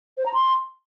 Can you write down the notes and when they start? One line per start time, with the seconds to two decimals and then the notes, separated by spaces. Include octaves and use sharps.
0.18 C5
0.26 A#5
0.34 C6